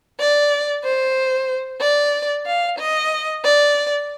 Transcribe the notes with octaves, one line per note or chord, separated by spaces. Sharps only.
D5
C5
D5
F5
D#5
D5